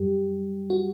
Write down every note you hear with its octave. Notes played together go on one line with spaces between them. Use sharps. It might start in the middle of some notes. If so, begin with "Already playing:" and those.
Already playing: F#2 G3 G4
F#4